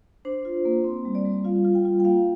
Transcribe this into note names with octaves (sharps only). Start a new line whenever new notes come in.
D4 C5
F4
A#3
C4
G3
D5
G3
F4 F5
F4
G5
F4
G5
A#3 F5